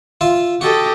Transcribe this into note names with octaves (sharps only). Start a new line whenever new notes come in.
F4 E5
F#4 G4 A4 D#5